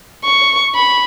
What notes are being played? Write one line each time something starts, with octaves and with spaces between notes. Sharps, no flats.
C#6
B5